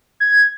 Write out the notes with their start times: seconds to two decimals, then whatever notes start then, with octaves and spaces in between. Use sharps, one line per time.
0.20 G#6